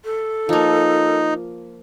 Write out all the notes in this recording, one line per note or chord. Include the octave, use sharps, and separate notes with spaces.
A4
F3 A#3 D#4